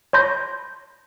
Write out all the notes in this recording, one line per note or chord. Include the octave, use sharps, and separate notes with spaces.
C#5 A5 B5 C6 G6 A#6